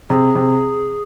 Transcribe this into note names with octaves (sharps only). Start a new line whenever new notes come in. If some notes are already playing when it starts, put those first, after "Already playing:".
C3 G#4
C3